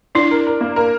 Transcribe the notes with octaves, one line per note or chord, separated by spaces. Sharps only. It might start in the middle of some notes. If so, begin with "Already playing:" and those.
D4 E4
A#4
A#4
A#3
A#4